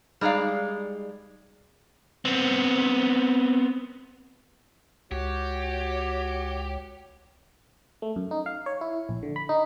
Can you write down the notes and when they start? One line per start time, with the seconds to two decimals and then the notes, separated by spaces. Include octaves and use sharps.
0.21 G3 G#3 D#4 D5 F5
2.25 B3 C4
5.11 C#2 F#4 G4 C#5
8.02 A3
8.16 F#2
8.31 D#4
8.46 F5
8.66 C#5
8.81 E4
9.09 A#1
9.23 D3
9.36 B5
9.49 D#4